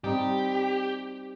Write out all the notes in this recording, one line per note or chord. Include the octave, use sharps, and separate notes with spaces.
G3 C4 D#4 G4